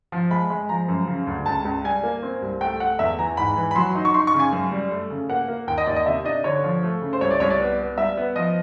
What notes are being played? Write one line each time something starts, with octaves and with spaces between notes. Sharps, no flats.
F3
G#3 B5
G#3
F3 A#5
F#2
C#3
D2
C#2 A5
C#2
G3 G#5
A#3
C4
C2
A3 G5
A3 F#5
E2 E5
E3 A#5
G#2 B5
E3
B5
F#3 C6
D#4
C#6
D#4 C6
C#6
C#3
G#5
F#2
G3
A3
C#3
A#3 F#5
A#3
D#2 G5
D#5
D#2 D5
D#5
C3 E5
D4 D#5
D3 C#5
F3
A3
C#3
C5
C2 C#5
D5
C2 C#5
D5
B3
B3
G3 E5
B3
F3 D#5